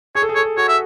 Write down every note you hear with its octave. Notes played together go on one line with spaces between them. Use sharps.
G#4 C#5
A4
G#4
A4 C#5
G#4
F#4 C#5
E5